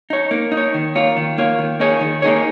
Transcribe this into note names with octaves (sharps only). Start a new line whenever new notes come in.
D#4 C#5
A#3
D#4
C#5
D#3
A#3 F4 C#5
D#3
A#3 F4 C#5
D#3
A#3 D#4 G#4 C#5
D#3
A#3 D#4 G#4 C#5